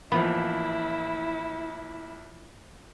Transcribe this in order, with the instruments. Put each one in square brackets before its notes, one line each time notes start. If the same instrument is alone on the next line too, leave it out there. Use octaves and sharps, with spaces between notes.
[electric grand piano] A1 A#3 B5 [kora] E3 F3 [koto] B3 [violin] E4